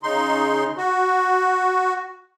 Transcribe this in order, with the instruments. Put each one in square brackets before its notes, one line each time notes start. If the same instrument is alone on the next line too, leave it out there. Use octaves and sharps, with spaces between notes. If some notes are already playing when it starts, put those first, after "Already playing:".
[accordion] C#3 D#4 C6
F#4